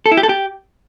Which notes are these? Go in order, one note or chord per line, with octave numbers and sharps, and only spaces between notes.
A4
E4
G4
A4
G4